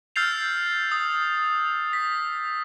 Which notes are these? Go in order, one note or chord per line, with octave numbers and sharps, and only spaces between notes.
E6 F6 G6 A6 C7 F7
D#6
B6